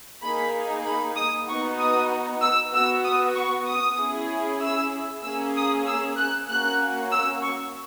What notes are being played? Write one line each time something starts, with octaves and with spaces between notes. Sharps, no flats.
A#3 D#4 G#4 B5
B5
D#6
B3 D#4 F#4 C#6
D#6
E6
B3 F#4 E6
D#6
C#6
D#6
C#4 E4 G#4
E6
A#3 C#4 G#4 E6
D#6
E6
F#6
A#3 C#4 F#4 F#6
E6
C#6